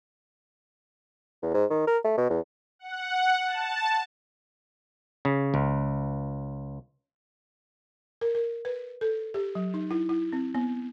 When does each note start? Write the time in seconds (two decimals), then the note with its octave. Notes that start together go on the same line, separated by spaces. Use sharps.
1.42 E2
1.54 G#2
1.70 D#3
1.87 A#4
2.04 A3
2.17 B2
2.30 E2
2.79 F#5
3.46 A5
5.25 C#3
5.54 C#2
8.21 A#4
8.35 A#4
8.65 B4
9.01 A4
9.34 G4
9.55 F#3
9.74 D#4
9.91 E4
10.09 E4
10.32 C4
10.54 B3